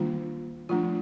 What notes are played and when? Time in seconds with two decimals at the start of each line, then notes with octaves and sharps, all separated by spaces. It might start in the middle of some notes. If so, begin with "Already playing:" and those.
Already playing: D#3 G3 A#3 D4 F4
0.69 F3 A3 D4 F4